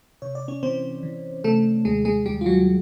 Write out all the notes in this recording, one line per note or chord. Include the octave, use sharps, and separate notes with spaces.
C3 C#5
D5
C#4 C#5
E3 C4 C5
E3
C3 A3 A4
D#2 G#3 G#4
G#3 G#4
D#2 G3 G4
F4
F#3 F#4